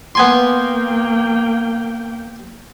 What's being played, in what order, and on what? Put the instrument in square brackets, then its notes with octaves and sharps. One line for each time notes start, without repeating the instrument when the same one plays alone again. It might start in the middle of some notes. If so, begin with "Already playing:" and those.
[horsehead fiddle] A#3 G5 [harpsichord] B3 G#5 C6